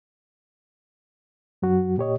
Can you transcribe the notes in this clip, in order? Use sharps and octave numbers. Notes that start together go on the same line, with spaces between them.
F#2 F#3 F#4
A#2 G4 C#5 D#5